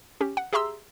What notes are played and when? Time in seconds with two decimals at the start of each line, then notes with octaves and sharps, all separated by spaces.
0.21 C#4 G4
0.37 F#5
0.53 G4 G#4 E5 A#5 C6 E6